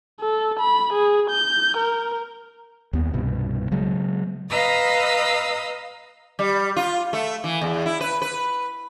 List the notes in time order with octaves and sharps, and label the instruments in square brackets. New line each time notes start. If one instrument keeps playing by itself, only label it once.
[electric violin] A4
B5
G#4
G6
A#4
[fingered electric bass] D#2 B3
C2 G2 B2
C#3 F#3 G#3
[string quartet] B4 D#5 F5 A#5 D#6 E6
[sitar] G3
F4
A3
E3
E2
E4
B4
B4